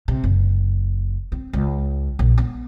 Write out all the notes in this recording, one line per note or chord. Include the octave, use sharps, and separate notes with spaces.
C3
F#1
C4
C#2
A#1
B3